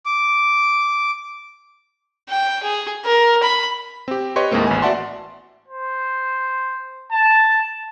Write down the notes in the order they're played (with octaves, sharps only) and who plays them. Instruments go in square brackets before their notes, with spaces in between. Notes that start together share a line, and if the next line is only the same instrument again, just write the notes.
[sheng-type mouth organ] D6
[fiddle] G5
G#4
A#4
B5
[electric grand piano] C4 G4
G4 B4 C#5 D#5 C6 C#6
D#2 A2 G#3 A#3 C4
A1 B3 G#5
F#4 D5 E5 F#5 A5 C6
[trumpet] C5
A5